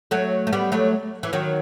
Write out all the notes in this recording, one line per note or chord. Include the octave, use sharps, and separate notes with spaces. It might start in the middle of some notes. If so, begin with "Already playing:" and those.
F#3 A3
A3
G3 B3
F#3 A3
E3
D#3 F#3